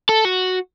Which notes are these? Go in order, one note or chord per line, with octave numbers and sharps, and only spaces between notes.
A4
F#4